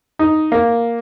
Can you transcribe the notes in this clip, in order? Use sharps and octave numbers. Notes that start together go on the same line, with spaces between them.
D#4
A#3